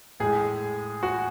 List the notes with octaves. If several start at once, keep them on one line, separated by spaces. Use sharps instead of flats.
A2 G#3 G#4
F#4